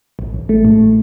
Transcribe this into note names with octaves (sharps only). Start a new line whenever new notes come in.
A1
A1
A3
A2